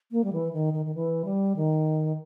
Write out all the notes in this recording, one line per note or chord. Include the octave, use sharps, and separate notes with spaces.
A#3
G3
E3
D#3
D#3
D#3
E3
G3
D#3